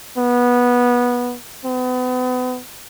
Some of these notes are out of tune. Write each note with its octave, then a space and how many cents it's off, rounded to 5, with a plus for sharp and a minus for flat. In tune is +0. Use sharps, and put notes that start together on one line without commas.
B3 -15
B3 +35